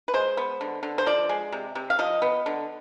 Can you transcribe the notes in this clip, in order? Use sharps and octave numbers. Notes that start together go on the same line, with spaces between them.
B4
G#3 C5
B3
D3
D3
C5
F3 D5
G#3
C3
C3
F5
F3 D#5
B3
D3